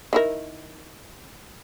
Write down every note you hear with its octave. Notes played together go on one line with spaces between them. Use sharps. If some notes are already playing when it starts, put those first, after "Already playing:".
D#3 E4 A#4